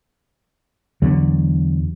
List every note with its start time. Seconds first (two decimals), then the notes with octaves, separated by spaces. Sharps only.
1.02 E2 D3 F#3